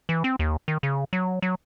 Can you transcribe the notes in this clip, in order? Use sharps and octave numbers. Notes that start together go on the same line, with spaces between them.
E3
C4
D#2
D#3
C#3
F#3
F#3